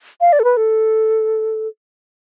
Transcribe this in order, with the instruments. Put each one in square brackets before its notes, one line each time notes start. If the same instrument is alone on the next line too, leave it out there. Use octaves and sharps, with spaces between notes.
[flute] F5
D5
A4
B4
A4